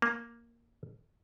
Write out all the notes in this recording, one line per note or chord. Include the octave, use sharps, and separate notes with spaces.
A#3